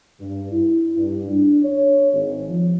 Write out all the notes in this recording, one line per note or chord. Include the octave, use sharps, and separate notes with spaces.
G2
E4
G2
D4
C#5
G#1
F3